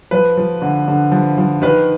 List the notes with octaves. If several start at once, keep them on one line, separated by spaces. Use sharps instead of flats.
F3 B4
F3
D3
D3
F3
F3
D#3 B4